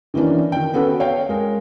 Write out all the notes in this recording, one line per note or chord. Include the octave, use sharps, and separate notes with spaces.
D#3 E3 A#3 C#4 D4
D#3 G5
B3 C#4 F#4 A4 B4
C#5 F5 G5
G#3 A#4